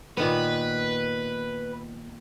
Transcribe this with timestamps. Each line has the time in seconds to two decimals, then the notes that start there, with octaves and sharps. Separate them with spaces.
0.17 A#2 D#3 B3 B4